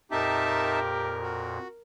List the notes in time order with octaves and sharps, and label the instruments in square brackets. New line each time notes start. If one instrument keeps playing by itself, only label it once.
[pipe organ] F2 A#2 [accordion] D#4 E5 A5 [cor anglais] G4 [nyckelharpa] A#4
[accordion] F#4